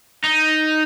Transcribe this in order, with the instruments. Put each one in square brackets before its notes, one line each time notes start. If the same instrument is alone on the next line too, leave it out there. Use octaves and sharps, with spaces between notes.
[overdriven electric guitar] D#4